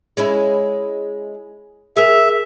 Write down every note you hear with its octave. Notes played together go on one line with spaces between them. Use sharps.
G#3 C#4 E4
G#4 A#4 E5